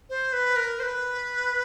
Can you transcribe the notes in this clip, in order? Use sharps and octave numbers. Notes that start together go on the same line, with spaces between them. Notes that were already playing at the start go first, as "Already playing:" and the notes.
C5
B4
A#4
C5
B4